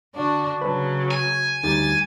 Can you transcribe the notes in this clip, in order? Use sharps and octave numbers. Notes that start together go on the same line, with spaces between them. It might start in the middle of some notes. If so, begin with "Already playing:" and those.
D3 D4 F#4
C#3 F#3 B4 A5
G#5
D2 G3 D#4 G4 A6